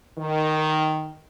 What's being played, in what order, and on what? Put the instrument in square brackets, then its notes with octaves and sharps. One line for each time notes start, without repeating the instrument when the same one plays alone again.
[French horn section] D#3